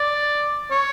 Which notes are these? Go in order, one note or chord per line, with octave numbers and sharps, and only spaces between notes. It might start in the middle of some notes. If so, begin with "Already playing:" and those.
Already playing: D5
C#5